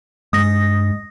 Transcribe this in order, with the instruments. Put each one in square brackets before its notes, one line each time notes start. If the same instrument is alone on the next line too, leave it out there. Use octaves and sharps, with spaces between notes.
[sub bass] G2 [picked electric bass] G#3 [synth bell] D#6 A#6